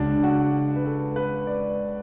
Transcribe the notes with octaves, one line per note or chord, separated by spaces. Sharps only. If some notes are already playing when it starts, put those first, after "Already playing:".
Already playing: C#2 C#3 G#3 D4 F#4
F#4
B4
A4
B4
D5